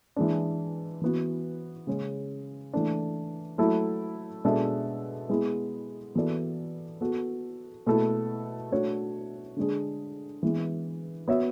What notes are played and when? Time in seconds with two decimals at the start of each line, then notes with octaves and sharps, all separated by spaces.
0.16 E3 G#3 D4
1.01 E3 B3 F#4
1.87 C#3 G#3 C#4
2.73 E3 A3 D4
3.58 F#3 A3 E4 A4
4.45 B2 G#3 D4 A4 E5
5.29 G#3 B3 E4 G#4
6.15 E3 B3 F#4 A4 D5
7.01 B3 F#4 A4
7.86 B2 A3 E4 A4
8.72 A3 D4 F#4 C#5
9.57 D3 G#3 D4 G#4
10.43 E3 G#3 B3
11.28 B3 F#4 C#5 E5